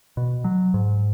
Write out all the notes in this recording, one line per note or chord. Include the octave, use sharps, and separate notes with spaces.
B2
F#3
G#2